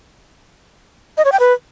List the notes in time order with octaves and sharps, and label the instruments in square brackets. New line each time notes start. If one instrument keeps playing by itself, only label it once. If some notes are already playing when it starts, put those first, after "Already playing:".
[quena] D#5
C#5
G5
B4